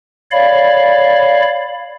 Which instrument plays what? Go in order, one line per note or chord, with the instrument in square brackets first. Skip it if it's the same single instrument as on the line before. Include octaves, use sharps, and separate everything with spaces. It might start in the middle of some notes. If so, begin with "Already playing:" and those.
[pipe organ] C#5 D5 F5 B5